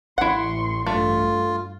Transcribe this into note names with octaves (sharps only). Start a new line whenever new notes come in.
A1 E4 F#5 C6 C#6
G2 A3 F4